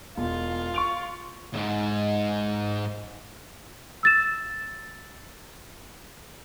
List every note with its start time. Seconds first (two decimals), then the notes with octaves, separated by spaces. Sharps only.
0.17 E1 F4
0.74 C#6 D7 F7
1.54 E2 G#2
4.03 E6 A6 E7